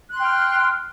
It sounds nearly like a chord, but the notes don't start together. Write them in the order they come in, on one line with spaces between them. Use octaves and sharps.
F#6 C6 G5 F6